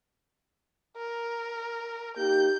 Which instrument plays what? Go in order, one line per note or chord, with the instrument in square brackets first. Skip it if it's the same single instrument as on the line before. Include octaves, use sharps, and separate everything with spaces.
[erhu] A#4
[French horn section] A#3 D#4 G4 [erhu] G6